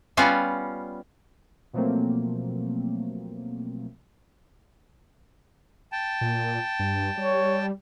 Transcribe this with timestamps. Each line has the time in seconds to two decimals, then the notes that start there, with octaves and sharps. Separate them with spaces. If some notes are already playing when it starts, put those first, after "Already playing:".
0.17 G3 B3 C#4 F4
1.73 B2 F3 F#3 A3 A#3 C4
5.92 G5 A5
6.21 A#2
6.79 G2
7.17 G3 C#5